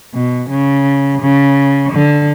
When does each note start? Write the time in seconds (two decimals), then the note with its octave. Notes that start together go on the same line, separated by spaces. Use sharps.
0.13 B2
0.49 C#3
1.20 C#3
1.91 D3